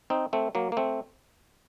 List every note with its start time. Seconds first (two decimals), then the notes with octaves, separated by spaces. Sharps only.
0.10 C4 D#4
0.33 A3 C4
0.55 F#3 A#3
0.72 A#3
0.77 A3 C4